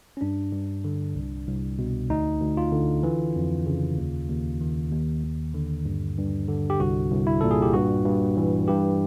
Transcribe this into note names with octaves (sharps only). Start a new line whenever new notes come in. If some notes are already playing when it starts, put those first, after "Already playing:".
C#4
G2 D4
G2
D3
C2
C2
B2
D2 D#4
D2
F4
D3
E3
F2
C#3
D#2
D#2
D#3
D#2
D#2
D3
G2
G2
D3
G4
C2 F#4
C2
E4
A#2 A4
G#4
G4
G2 F#4
G2
E3
G2 G4